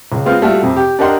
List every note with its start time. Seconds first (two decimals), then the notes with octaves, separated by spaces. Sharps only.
0.12 C#2
0.25 G#3 B3 C4 F4
0.41 G3 A3 F4 F#4
0.62 F2 C3
0.76 G4
0.99 D4 G4 A#4 D#5 F#5 C6